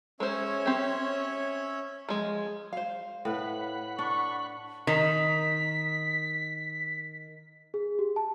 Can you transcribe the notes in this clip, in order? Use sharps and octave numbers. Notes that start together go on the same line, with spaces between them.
G#3 C#4 C5 C#5 E5
C4 G4
F3 G#3
C5 F5
A2 B4 F#5 B5
D4 C#6
D#3 B6
G#4
G4
A5